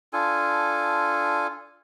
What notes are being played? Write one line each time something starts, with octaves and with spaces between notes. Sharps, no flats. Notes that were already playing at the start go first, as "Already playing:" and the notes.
D4 F4 A4 G#5